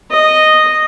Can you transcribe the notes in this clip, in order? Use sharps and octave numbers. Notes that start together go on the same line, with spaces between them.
D#5